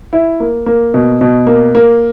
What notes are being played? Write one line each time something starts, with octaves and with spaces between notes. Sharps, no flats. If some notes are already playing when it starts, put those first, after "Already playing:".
E4
A#3
A#3
B2
B2
A#3
A#3